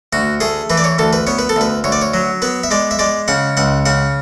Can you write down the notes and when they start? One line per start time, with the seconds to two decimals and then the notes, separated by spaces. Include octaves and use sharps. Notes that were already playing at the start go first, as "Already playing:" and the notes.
0.13 D2 F#4
0.40 A3 G#4
0.70 E3 B4
0.77 D5
0.84 C#5
0.99 D2 A4
1.13 B4
1.27 B3 C#5
1.39 B4
1.49 A4
1.56 D2 B4
1.84 D2 C#5
1.92 D5
2.01 C#5
2.14 F#3
2.42 B3 B4
2.64 E5
2.71 G#3 D5
2.91 E5
2.99 G#3 D5
3.28 C#3 F#5
3.57 C#2 F#5
3.86 C#3 F#5